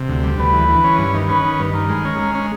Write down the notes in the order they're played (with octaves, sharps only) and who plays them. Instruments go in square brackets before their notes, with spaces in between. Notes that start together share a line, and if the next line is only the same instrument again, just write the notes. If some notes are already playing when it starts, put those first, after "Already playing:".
Already playing: [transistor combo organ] C3
D2
G3
[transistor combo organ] D2 [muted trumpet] B4
[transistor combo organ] E3
E3
C#4
G2
D#3
[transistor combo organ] C#4 [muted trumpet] B4
[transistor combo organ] D#3
G2
[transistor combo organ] D#3 [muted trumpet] A#4
[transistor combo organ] G#3
C#4
G#3
C#4